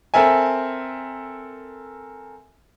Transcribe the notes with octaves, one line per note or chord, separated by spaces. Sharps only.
C4 A4 A#4 E5 G#5